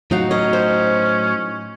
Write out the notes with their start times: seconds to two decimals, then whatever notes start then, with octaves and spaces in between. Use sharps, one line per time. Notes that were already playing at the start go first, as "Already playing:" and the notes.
0.11 A2 F#3 D#4 F#4 F5
0.31 C#4 D#5
0.53 C5